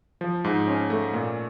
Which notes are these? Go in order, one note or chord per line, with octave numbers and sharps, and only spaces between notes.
F3
G#2
C#4
A3
A#2